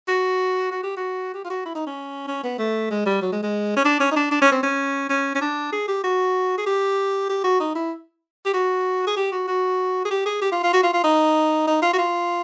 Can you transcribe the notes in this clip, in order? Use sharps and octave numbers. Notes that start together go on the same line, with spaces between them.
F#4
F#4
G4
F#4
G4
F4
F#4
E4
D#4
C#4
C#4
B3
A3
G#3
G3
F#3
G#3
G#3
C#4
D4
C#4
D#4
D4
D4
C#4
C4
C#4
C#4
C#4
D4
G#4
G4
F#4
G#4
G4
G4
F#4
D#4
E4
G4
F#4
G#4
G4
F#4
F#4
G#4
G4
G#4
G4
F4
F4
F#4
F4
F4
D#4
D#4
F4
F#4
F4